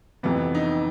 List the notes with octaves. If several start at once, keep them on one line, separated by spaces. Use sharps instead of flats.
F2 C3 E3 B3
D#4